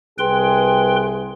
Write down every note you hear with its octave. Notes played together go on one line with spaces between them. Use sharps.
C2 G#4 B4 G5 C6